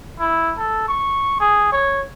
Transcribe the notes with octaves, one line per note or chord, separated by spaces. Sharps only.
E4
A4
C#6
G#4
C#5